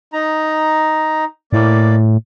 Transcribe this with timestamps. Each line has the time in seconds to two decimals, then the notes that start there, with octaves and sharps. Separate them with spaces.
0.13 D#4 A#5
1.53 A2 A#3 D5